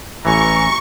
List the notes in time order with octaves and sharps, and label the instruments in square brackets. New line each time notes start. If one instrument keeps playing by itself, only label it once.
[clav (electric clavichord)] A1 E3 [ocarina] G#5 [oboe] A#5 [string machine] C#6